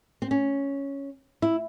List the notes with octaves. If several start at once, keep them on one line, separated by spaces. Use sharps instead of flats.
C4
C#4
E4